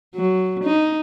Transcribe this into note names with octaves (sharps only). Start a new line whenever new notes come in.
F#3
D#4